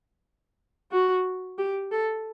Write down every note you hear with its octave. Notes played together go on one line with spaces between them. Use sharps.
F#4
G4
A4